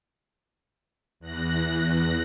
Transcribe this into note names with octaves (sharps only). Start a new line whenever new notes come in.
E2 F#6 A#6